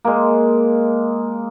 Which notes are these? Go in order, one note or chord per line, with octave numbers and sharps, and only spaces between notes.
G#3 A#3